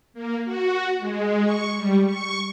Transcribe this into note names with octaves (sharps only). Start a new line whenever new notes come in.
A#3
F#4
G#3
C#6
G3
C#6